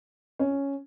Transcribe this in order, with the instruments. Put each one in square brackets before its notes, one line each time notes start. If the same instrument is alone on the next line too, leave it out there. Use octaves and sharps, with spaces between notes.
[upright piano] C#4